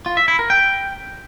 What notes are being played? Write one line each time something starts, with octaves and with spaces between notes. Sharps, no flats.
F4
E5
E4
A#4
G5